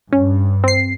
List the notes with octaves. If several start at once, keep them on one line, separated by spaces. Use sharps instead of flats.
G2 C#4
C4 C7